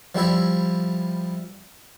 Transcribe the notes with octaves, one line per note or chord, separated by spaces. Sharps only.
F3 G3 E4 E5